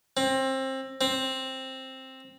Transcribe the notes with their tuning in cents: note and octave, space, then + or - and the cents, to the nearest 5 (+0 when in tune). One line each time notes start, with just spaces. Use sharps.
C4 +25
C4 +10